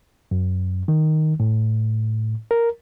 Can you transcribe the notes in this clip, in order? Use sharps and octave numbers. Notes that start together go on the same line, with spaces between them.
F#2
D#3
A2
A#4